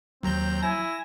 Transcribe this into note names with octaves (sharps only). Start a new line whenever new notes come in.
D#2 F#3 C4 A#5 G6
E4 G#5 A#6